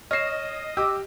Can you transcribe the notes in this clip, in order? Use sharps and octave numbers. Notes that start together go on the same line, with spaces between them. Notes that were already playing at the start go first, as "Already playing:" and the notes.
C#5 D#5 F6 A#6 C7 E7
G4 D6 E6